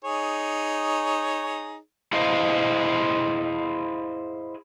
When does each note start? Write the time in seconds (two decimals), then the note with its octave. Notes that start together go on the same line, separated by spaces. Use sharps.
0.04 D#4 G#4 C#5
2.13 E4 G#4 C5 D#5 F5